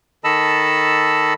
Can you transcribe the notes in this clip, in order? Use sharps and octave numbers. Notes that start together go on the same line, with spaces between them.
D#3 A4 D#5 A5 B5 E6